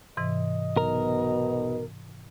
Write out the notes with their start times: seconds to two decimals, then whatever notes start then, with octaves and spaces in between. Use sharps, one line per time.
0.17 G#2 C3 E3 D#5
0.77 B1 B2 A#4